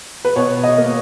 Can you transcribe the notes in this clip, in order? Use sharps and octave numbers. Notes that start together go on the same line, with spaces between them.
B4
B2 C#5
D#5
A#3